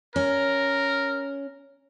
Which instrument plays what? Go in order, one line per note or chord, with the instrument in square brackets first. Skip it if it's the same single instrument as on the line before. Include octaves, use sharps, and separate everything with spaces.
[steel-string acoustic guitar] C#4 [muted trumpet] A#4